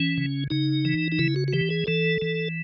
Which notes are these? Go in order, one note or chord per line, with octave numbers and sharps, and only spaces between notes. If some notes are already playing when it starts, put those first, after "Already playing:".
Already playing: E3 C#4
C#3
C#3 D#4
E3
D#4
C#3 E4
F#4
F#4
E3 G4
G#4
E3 A4
E3